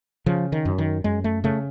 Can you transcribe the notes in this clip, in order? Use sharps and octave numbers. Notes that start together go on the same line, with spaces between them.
C#3 F3
D#3
F#2
D#3
F#2 G#3
A3
C#3 A3